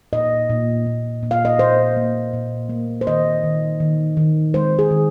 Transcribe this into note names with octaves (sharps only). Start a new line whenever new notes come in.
A#2 D#5
A#2
A#2
A#2
F5
D#5
A#2 C5
A#3
A#2
A#3
C5
D#3 D#5
D#3
D#3
D#3
G#3 C5
G#4
D#3